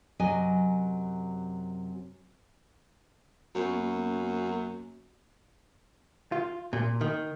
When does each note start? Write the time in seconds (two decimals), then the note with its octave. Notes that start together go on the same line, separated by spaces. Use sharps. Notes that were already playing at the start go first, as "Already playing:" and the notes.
0.19 F#2 C3 F#3 D#5 G#5
3.55 F#2 A#3 B3 C#4
6.32 F4
6.73 A#2
7.01 D#3